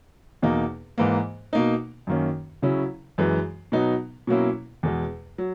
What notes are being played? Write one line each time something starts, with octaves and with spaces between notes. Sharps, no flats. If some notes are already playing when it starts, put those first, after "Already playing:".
E2 B2 A#3 D#4
G#2 E3 A#3
B2 A#3 D#4
F#2 D#3 A#3 C#4
C#3 F#3 C#4 E4
F#2 E3 G#3
B2 F#3 B3 D#4
B2 F#3 A#3 C#4 E4
E2 B2 G#3
F#3